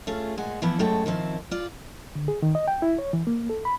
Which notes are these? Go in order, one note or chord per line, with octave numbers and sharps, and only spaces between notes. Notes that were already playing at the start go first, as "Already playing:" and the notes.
A3 C#4 F4 G#4
A#2 G#3 F#5 G#5
E3 F3 B3 E4 B4
F#2 G#3 A3 C#5 G5 A5
D#3 F3 C4 E4
F4 D5
D3
G#4
D#3
D#5
G5
E4
C#5
E3
A#3
A4
B5